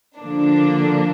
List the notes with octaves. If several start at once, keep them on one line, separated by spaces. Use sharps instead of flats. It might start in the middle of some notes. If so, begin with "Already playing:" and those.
D3 F3 A#3 D4